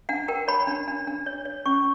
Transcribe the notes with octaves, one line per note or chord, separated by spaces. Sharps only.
D4 F#5
A#4 G5
C#5 B5
D4
D4
D4
C#5
C#5
C#4 C#6